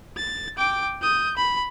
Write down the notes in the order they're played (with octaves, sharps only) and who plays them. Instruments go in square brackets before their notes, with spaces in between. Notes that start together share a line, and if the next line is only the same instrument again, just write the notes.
[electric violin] A6
G5 D6
D#6 G6
B5